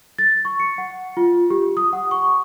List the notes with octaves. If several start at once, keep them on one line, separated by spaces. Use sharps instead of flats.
A6
C#6
C#7
F#5
F4
G4
D#6
F#5
C#6